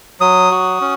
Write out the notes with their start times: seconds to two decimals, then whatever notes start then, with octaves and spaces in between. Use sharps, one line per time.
0.21 F#3 D#6
0.51 F#4
0.81 C#4